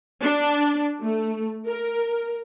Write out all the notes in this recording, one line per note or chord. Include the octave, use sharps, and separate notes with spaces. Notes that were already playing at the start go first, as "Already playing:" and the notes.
D4
A3
A#4